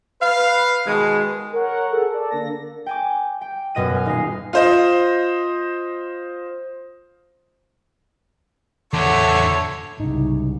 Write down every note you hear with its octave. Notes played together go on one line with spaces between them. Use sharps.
B4 F5
B2 D#3 G#3
A#4 C#5 F#5
G#4 A4 F#5
A4 D5
D3 A#3 A#6
G5 G#5 D6
G5
F#2 B2 D#5 F#6 D#7
G#5 F6
D#1 D#4 D#5 F5 C7
F4 C5 D#5
E2 D3 A3 C#5 E5 F#5
C2 G#2 C#3 D#4